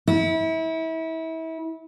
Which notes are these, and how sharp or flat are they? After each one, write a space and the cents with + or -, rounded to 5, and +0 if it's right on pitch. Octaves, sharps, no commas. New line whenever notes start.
E4 -30